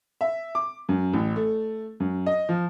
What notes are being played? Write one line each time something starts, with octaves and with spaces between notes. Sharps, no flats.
E5
D6
F#2
A1
A3
F#2
D#5
F3